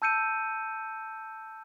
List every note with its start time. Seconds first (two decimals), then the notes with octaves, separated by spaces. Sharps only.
0.02 A5 E6 G6 C#7 D#7